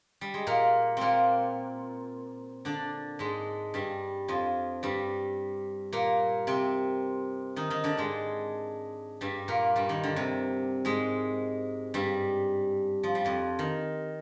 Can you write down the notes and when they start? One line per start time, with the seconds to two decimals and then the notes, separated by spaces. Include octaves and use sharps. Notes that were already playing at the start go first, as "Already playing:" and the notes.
0.21 G3
0.34 G#3
0.47 A#2 A#3
0.97 A#2 A#3 C4
2.65 D3 D4
3.19 G#2 G#3
3.74 G2 G3
4.28 F2 F3
4.83 G2 G3
5.93 A#2 A#3
6.47 C3 C4
7.56 D#3 D#4
7.70 D#3 D#4
7.84 D3 D4
7.97 G#2 G#3
9.21 G2 G3
9.48 A#2 A#3
9.76 G2 G3
9.89 D#3
10.04 D3
10.16 C3
10.85 G#2 G#3
11.94 G2 G3
13.03 F3
13.15 G3
13.24 F2 F3
13.59 D#3